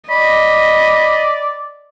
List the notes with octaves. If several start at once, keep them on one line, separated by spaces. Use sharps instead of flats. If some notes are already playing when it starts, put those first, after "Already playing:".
D5 D#5 B5